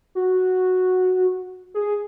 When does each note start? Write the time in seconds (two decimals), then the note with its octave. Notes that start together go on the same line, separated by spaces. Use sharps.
0.15 F#4
1.74 G#4